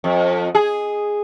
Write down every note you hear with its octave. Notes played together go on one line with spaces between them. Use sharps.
F2
G#4